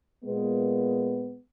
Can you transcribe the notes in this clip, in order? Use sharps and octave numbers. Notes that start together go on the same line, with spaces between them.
A#2 G#3 B3